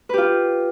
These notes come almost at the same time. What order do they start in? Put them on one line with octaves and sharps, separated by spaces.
B4 G4 F4